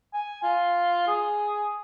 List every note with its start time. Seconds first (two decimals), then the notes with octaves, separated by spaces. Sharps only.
0.13 G#5
0.43 F4
1.07 G#4